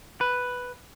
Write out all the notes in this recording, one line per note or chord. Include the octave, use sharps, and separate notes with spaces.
B4